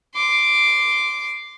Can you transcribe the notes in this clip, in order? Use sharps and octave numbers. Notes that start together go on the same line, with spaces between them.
C6 D6